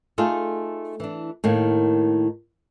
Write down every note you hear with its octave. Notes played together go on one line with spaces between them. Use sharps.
A3 D#4 F4 G#4 A4
E3 D4
A2 D#3 A#3